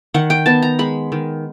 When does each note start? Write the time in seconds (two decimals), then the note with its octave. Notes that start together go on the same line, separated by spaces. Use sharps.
0.14 D#3 F#5
0.30 G5
0.46 B3 A5
0.62 A#5
0.79 G#3 B5
1.12 D#3